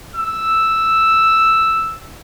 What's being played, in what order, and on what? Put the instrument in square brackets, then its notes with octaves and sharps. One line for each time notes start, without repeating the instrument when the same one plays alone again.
[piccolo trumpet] E6